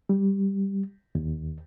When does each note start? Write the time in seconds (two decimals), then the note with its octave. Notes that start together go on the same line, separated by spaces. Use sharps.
0.09 G3
1.15 D#2